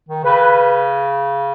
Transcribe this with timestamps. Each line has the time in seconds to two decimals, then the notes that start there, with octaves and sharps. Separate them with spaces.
0.09 D#3
0.24 C#3 B4